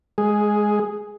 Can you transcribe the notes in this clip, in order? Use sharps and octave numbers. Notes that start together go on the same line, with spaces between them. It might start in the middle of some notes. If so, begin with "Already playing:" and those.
G#3 G#4